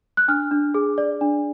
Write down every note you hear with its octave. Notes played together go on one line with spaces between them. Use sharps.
F#6
D4 F6
D4
G#4
D5
D4